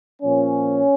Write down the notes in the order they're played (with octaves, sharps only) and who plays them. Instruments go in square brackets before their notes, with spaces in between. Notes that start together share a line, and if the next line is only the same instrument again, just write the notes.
[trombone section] A#2 F3 A#3 C#4